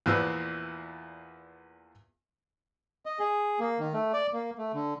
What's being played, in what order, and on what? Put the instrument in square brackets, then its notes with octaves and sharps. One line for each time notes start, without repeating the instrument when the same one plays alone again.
[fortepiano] E2 A#2 F3 B3 E6
[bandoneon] D#5
G#4
A#3
D#3
A3
D5
A#3
A3
D3